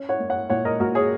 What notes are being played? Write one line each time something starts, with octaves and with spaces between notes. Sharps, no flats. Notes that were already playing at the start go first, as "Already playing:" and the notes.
Already playing: C#4
C#5 F#5
A#3
C#5 F#5
A#2 C#5 F#5
A#4 D#5
A#2 F#4 A#4
G#4 C#5